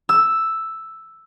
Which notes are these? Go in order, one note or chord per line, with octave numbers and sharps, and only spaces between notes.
E6